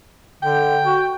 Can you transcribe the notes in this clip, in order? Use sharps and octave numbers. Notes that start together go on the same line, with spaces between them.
D3 G5
F#4